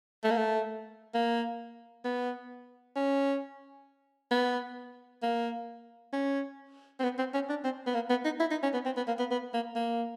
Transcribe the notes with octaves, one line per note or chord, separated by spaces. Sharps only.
A3
A#3
A3
A#3
B3
C#4
B3
A#3
C#4
C4
B3
C4
C#4
D4
C4
B3
A#3
B3
D#4
E4
D#4
C#4
B3
C4
B3
A#3
B3
B3
A#3
A#3